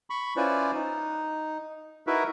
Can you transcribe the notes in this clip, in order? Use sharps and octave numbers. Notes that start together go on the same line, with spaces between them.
B5 C#6
C#4 E4 F4 B4 C5 D5
D#4
D#4 E4 F#4 A#4 B4 E5